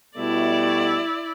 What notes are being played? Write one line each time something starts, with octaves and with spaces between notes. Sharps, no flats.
B2 G3 A3 E4 D5